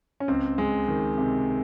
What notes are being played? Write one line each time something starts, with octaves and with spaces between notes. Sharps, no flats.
C#4
C#2 C4
G#3
D#3
C3